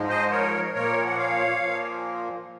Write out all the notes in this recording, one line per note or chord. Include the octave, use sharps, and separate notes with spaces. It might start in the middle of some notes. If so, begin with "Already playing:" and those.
Already playing: G#2 F3 G#3
C5 D#5
A#4 C#5
A#2 F3 A#3 A#4 C#5
F#5
C#5 F5
A#2 F3 A#3